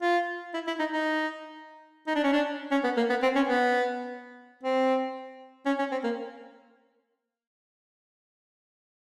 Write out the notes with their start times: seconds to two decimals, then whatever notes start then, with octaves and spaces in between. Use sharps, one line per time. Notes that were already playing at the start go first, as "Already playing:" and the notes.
0.03 F4
0.54 E4
0.68 E4
0.80 D#4
0.93 D#4
2.08 D#4
2.16 D4
2.24 C#4
2.33 D4
2.72 C#4
2.84 B3
2.97 A#3
3.10 B3
3.23 C4
3.36 C#4
3.48 B3
4.64 C4
5.66 C#4
5.79 C#4
5.92 C4
6.04 A#3